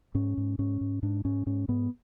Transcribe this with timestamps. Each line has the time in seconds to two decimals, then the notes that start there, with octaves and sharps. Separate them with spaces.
0.15 G#2 C#4
0.37 G#2
0.59 G#2 C#4
0.81 G#2
1.03 G#2 D4
1.25 G#2 C#4
1.46 G#2 C#4
1.68 G#2 B3